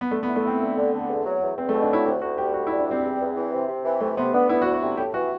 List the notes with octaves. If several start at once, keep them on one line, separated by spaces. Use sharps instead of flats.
B3
D3 A3
B3
E4
A3
C4 E4
D3
D3
D3
E2
F#3
E2
E2 C4
A3
B2
D4
F#3 E4
D2 G4
D2 F#4
G3 G4
D2 F#4
E4
G3
D4
G3 C4
E2
E2
E3
C3
C3
E3
C3 A3
C3 B3
B3 D4
B3 E4
F#4
D2
F#4
C3
A2 G4
E3 F#4